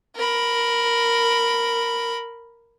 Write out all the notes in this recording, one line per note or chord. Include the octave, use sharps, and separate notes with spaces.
A#4 B5